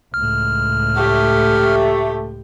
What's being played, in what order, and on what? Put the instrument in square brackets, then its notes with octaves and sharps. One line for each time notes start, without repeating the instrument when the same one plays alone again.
[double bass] C#2 A2 [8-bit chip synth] F6
[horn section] A3 [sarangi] G4